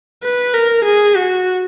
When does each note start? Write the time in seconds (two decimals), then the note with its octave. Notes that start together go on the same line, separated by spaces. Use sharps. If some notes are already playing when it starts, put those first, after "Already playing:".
0.24 B4
0.54 A#4
0.84 G#4
1.16 F#4